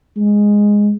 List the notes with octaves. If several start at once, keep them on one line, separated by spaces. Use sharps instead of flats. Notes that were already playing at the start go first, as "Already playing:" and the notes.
G#3